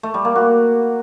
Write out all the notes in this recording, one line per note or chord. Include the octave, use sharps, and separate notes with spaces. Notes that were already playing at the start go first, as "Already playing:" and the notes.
A3
G3
A#3
F#4